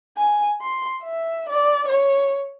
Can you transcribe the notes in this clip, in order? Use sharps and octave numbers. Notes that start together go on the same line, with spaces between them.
G#5
C6
E5
D5
C#5